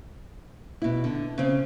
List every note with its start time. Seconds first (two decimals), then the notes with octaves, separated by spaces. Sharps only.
0.82 B2 E4
1.04 D3
1.38 C#3 C4 C#4